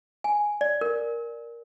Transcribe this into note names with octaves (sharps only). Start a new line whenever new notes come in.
G#5
D5
A#4